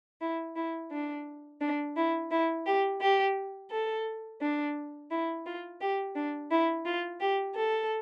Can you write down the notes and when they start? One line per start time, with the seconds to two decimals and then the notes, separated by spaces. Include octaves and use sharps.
0.21 E4
0.56 E4
0.92 D4
1.61 D4
1.97 E4
2.31 E4
2.66 G4
3.01 G4
3.71 A4
4.41 D4
5.11 E4
5.46 F4
5.81 G4
6.16 D4
6.51 E4
6.86 F4
7.21 G4
7.55 A4